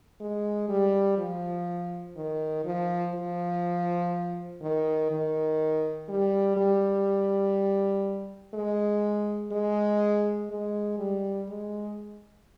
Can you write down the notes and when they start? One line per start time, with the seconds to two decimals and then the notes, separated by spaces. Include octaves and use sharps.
0.20 G#3
0.68 G3
1.17 F3
2.16 D#3
2.65 F3
3.14 F3
4.61 D#3
5.11 D#3
6.08 G3
6.57 G3
8.54 G#3
9.51 G#3
10.50 G#3
10.98 G3
11.48 G#3